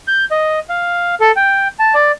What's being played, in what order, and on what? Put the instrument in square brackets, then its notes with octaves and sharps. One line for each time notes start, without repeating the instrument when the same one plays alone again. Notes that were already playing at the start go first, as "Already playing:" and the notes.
[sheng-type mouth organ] G6
D#5
F5
A4
G5
A5
D5